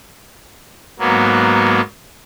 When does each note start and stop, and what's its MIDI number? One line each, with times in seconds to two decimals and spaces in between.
0.99 1.81 44
0.99 1.81 54
0.99 1.81 58
0.99 1.81 59